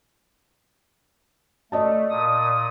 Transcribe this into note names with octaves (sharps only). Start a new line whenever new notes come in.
A3 D5 D#5 A5
A#2 D#6